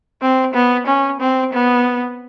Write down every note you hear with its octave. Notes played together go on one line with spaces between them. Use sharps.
C4
B3
C#4
C4
B3